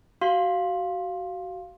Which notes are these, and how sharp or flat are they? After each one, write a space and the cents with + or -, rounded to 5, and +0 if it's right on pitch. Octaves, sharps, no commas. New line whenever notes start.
F#4 +25 F5 +0 C6 +15